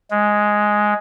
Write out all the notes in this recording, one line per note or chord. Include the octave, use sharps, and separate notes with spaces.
G#3